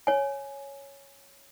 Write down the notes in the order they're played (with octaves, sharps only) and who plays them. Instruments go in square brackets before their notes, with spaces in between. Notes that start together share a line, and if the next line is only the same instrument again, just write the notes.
[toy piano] C#5 G#5